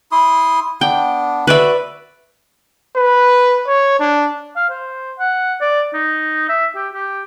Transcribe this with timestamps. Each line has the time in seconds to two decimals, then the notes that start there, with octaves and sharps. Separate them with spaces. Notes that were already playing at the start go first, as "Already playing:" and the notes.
0.12 E4 C6 D#6
0.81 B3 D4 G5
1.47 F#4 B4 D5 E5
2.96 B4
3.68 C#5
3.99 D4
4.56 F5
4.70 C5
5.19 F#5
5.61 D5
5.94 D#4
6.49 E5
6.76 G4
6.94 G4